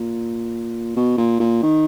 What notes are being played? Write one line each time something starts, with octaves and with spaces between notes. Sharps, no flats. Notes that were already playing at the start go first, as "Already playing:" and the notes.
Already playing: A#2
B2
A#2
A#2
D#3